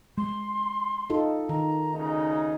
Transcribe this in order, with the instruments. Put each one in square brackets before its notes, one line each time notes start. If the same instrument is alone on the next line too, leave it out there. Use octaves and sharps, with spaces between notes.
[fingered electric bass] G#3 [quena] C6
[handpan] D#4 F4 A4
[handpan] D#3 [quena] A#5
[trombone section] D2 C#3 D#4